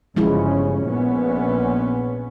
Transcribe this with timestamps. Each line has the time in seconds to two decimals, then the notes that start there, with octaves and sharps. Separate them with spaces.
0.16 G1 C#3 F3 G#3 C#4 E4
0.85 A#1 B3 C#4